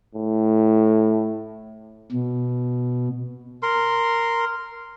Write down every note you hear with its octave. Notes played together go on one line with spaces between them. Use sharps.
A2
B2
A#4 C6